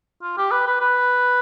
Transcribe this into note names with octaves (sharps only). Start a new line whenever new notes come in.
F4
G4
B4
B4
B4